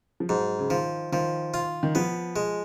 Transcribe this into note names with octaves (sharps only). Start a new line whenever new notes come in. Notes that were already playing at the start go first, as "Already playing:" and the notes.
F3
G#2 F#3
C#3
D#3 F3
D#3 F3
F4
D#3
F3 B3
G#3